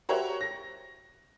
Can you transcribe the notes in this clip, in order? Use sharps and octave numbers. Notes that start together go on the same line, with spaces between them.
F#4 G4 A#4 C5 C#5 E5
A#6